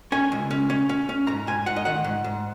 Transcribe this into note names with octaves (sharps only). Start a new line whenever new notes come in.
C#4 G#5
C#2
C#4
C#4
C#4
C#4
G#2 A#5
G#2 G#5
G#2 F#5
D#5
D#3 F#5
G#2
G#2